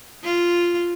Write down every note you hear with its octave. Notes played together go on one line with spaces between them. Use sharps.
F4